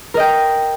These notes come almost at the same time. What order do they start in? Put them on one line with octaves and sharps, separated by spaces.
A#4 D#5 G5